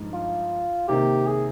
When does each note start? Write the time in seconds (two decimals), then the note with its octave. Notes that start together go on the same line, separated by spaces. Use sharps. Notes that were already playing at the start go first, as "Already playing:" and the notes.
Already playing: G2 F3 G#3 D#4
0.13 F4
0.88 C3 D#3 A#3 G4
1.26 G#4